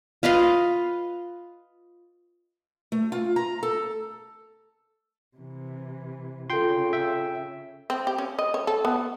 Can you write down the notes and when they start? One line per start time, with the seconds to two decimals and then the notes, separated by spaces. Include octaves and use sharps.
0.23 F4 B4 D#5 F5
2.92 A3
3.12 F4
3.36 A#5
3.63 A4
5.37 C3 E3
6.50 C#3 F4 A4 G5 C6
6.93 E5 G5
7.90 C4
8.07 G4
8.18 C#4
8.39 D#5
8.54 C#5
8.67 A4
8.85 B3